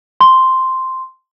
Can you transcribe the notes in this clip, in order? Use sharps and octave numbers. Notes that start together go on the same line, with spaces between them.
C6